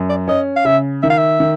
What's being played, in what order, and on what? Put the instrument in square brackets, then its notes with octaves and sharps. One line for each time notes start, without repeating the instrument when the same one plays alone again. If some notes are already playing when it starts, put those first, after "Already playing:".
Already playing: [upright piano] F#2
[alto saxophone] D5
[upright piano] C#4 [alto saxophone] D#5
[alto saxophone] F5
[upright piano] C#3 [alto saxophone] E5
[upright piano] D#3 [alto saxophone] E5
[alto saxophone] F5
E5
[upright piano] D#3